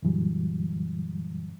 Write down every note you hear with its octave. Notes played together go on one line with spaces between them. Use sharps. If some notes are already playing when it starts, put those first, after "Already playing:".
F#2 A#2 D3 E3 F#3 G3